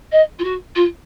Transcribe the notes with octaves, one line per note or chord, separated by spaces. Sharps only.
D#5
F4
F#4
F4